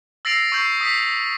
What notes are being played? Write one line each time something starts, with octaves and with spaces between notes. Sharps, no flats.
E6 A6 A#6 C7 D7 F7
C#6 E6 G6 C7
D#6 B6 C7